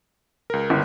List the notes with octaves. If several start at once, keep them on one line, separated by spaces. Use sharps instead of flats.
C#2 A#4
G1